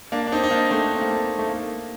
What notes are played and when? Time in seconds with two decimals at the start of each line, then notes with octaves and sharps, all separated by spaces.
0.12 A#3 D4
0.27 D4
0.32 C4 D#4
0.44 D#4
0.51 A#3 D4
0.70 A3 C4
0.86 D4
0.95 C4
1.02 A#3
1.10 A3
1.39 A3
1.49 A#3